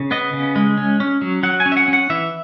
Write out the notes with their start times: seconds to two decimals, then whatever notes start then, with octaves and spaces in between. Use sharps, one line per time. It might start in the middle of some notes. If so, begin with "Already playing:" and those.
Already playing: C#3
0.11 B3 D#5
0.33 C#3
0.56 G#3
0.77 C#4
1.00 C#4
1.22 F#3
1.43 F#3 F#5
1.60 G#5
1.66 C#4
1.72 E5
1.77 F#5
1.88 C#4 F#5
2.10 E3 E5